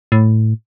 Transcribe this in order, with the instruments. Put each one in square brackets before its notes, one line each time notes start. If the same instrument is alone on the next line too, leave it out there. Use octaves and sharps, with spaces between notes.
[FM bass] A2